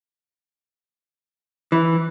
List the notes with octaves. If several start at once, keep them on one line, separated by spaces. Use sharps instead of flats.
E3